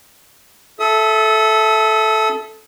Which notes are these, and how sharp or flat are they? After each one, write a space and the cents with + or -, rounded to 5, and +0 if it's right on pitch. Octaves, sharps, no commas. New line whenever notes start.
A4 -10 E5 +0 D#6 +35